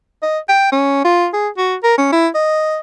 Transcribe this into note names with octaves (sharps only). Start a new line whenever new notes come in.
D#5
G5
C#4
F4
G#4
F#4
A#4
C#4
E4
D#5